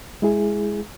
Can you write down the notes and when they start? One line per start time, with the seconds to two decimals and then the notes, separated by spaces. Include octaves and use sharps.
0.22 G#3 E4 G#4